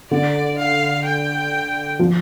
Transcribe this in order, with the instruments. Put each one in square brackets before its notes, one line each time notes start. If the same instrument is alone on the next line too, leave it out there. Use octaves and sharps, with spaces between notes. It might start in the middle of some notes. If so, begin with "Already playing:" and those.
[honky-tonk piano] D3 [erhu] D5
[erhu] F5
G5
[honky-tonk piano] F3